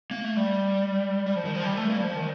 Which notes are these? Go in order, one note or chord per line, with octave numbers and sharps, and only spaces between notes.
A#3
A3
G3
G3
F3
D#3
F3
G3
A3
A#3
G3
F3
D#3